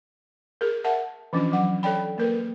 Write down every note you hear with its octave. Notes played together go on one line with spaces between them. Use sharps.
G#4 A#4
A#4 E5 F#5 A5
E3 F3 C#4 D4 F4
F#3 F#5
A4 C#5 D5 G5 B5
A#3 A#4 B4